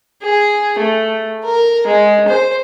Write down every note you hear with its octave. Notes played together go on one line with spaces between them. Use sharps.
G#4
A3
A#4
G#3
C5